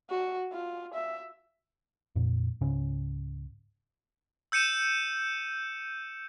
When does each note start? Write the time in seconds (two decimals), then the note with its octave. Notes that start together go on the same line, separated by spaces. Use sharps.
0.10 F#4
0.53 F4
0.95 E5
2.16 F2 A#2
2.61 C#2 G#2 C#3 C#4
4.52 E6 G6 C#7 D#7 E7